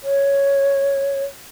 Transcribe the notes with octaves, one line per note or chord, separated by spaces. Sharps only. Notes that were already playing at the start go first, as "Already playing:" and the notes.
C#5